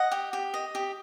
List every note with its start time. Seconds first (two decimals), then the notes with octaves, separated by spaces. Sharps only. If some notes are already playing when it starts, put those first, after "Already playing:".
Already playing: D#5 F#5
0.11 G4
0.33 G4
0.54 D#5
0.75 G4